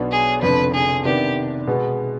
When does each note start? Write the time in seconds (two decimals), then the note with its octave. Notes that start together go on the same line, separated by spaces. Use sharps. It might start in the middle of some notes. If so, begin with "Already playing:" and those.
Already playing: B1 B2 B3 D4
0.12 G#4
0.42 F1 F2 D3 F3 B4
0.74 G#4
1.05 C3 D#3 B3 D4 G4
1.67 B2 G#3 B3